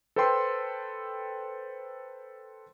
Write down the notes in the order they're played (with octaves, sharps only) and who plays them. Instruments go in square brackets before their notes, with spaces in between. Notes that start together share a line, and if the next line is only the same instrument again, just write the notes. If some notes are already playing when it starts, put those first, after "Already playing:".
[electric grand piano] A4 B4 C5 G5 C6 E6